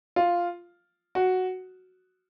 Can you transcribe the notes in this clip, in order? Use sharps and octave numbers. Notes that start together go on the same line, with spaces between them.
F4
F#4